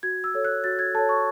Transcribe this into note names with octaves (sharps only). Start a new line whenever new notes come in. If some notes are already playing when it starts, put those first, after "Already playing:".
F#4 G#6
E6
A4 C#5
F#6
F#4 A6
G#6
A4 C#5 A5
C#6